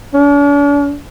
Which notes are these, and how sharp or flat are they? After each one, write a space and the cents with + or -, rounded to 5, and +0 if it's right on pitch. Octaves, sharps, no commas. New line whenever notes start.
D4 -45